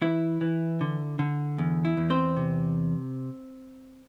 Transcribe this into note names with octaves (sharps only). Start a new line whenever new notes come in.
E3 E4
E3
D3
D3
E2
E4
E2
C4 C5
C3